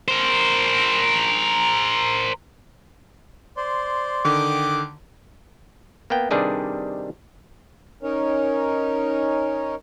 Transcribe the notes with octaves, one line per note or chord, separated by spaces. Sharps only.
A#4 C5
C5 D5 C6
D3 D#3 G5 D6 D#6
A#3 B3 G5
C3 D#3 G3 D4 G#4 B4
C#4 D#4 A#4 C#5